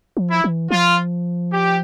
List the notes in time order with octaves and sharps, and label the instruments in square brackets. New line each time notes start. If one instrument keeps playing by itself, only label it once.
[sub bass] F3
[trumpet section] E4
[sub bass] E3
[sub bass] F3 [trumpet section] F4
[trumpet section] G4